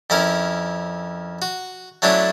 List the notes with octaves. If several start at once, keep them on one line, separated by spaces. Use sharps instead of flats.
F2 C#4 E4 A#4
F#4
F#3 A3 C#4 D4 E4 F#4